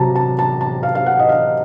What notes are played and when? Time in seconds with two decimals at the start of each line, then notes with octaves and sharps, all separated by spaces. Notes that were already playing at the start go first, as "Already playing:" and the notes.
Already playing: C3 F#3 A5 A#5
0.15 A5
0.39 A5
0.61 A5
0.83 F5
0.95 F5
1.06 F#5
1.19 D#5
1.29 F5